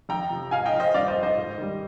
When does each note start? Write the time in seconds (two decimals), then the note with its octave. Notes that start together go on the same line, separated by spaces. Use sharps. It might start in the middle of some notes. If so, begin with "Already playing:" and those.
0.09 F2 G5 A#5
0.30 C3 F3
0.51 G#2 F5 G#5
0.65 D#5 G5
0.73 F3 F5
0.80 C5 D#5
0.94 G2 D5 F5
1.08 C5 D#5
1.16 F3
1.23 C5 D#5
1.37 G#2
1.58 D#3 G3